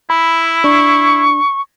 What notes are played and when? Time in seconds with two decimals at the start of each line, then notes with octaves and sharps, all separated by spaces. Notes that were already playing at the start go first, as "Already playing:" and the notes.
0.10 E4 B5
0.64 D4 C#6